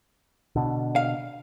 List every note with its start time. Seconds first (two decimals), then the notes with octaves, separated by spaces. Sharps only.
0.56 B2 D3
0.96 F5